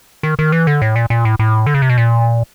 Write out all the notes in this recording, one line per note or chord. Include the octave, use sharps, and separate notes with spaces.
D#3
D#3
E3
D3
A2
A#2
A#2
A2
A2
D3
C#3
C3
B2
A#2